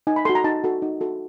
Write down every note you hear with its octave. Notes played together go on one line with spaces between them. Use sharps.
D#4 G#5
B5
F#4 A4 C6
A#5
D#4 A5
F#4 A4
D#4
F#4 A4